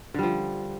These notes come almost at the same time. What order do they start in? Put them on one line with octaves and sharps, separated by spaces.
D3 G3 F3